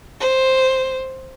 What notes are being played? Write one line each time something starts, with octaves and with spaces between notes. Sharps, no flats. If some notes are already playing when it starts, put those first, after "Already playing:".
C5